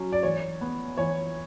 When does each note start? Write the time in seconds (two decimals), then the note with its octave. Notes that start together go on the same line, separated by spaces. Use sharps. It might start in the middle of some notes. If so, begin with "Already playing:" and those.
Already playing: F#3 C#4
0.12 D5
0.23 E3 C#5
0.61 B3
0.98 E3 C#5